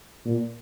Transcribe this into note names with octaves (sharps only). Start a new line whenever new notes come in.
A#2